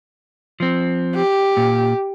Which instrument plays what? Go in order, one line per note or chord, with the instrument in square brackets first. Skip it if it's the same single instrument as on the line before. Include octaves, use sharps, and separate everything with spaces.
[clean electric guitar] F3 C4
[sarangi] G4
[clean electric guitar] A#2